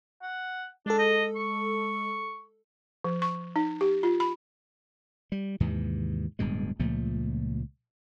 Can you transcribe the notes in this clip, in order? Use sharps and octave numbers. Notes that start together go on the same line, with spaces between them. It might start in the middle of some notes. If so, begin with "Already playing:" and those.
F#5
G#3 D4 A4
D#5
C#6
F3
C#6
D#4
G4
F4
B5
G3
D#2 G#2 C3 E3
D1 G2 B2 G#3
C#2 A#2 F3 A3